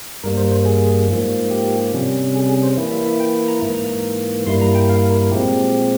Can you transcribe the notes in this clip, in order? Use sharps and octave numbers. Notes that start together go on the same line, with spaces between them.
G2 G3 A#3 A#4
C5
C5
G#4
G#2 F3 A#3
G4
C3 G3 C#4
G#4
G#4
C5
E3 A#3 E4
E5
E5
G5
A#5
G#2 E3 A#3
G2 G3 A#3 E4 C6
A#5
G5
F5
A#4
A#2 F3 G#3 C4 G4